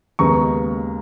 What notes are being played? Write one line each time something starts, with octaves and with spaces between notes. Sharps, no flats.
D#2 C#3 G#3 B3 A#5 C#6